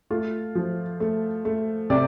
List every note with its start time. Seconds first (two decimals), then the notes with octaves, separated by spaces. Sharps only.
0.11 A3 F4
0.55 F3
1.00 A3
1.45 A3
1.90 C3 D5